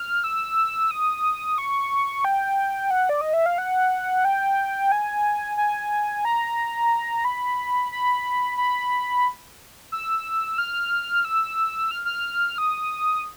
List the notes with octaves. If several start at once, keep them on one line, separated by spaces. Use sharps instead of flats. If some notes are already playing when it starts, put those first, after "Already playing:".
Already playing: F6
E6
D#6
C#6
G5
F#5
D5
D#5
E5
F5
F#5
G5
G#5
G#5
A#5
B5
B5
B5
E6
F6
E6
F6
F6
D#6